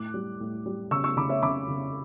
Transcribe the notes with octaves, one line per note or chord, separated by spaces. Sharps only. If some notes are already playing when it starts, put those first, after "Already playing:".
Already playing: A2 D6 F#6
G3
A2
G3
C#3 C#6 E6
C#6 E6
C#3 B5 D6
C#5 E5
C#3 B5 D6
C#3